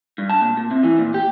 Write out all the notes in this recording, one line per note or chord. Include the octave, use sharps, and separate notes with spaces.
G2
A5
A#2
A#2
C3
E3
A#2
G4